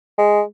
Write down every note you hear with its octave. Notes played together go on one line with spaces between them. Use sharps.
G#3